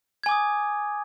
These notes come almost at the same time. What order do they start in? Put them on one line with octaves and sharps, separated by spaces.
G#6 G#5 D6 D#6